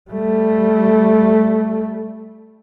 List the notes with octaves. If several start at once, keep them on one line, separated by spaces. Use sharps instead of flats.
G3 A3